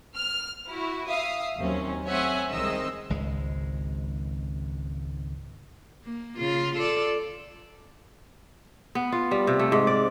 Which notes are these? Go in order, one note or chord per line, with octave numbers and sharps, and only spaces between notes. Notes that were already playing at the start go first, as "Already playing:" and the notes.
F6
E4 F#4
E5 F5 D#6
D#2 F#3 C4 C#4
A3 C4 C#5 E5 F#5 G#5
C2 D#3 G#3 C4 D#5 E6
G#1 C#2 G#3
A#3
C#3 F4
F4 A4 D5
B3
F4
G3
C3
A3
G#2
D5